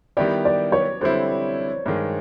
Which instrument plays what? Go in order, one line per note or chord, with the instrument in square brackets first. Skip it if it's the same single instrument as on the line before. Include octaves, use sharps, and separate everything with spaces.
[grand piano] D#3 G3 B3 E4 G4 [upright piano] D5
[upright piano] D5
C#5
[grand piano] D3 G3 C4 E4 [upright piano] C5
[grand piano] G2 D#3 G#3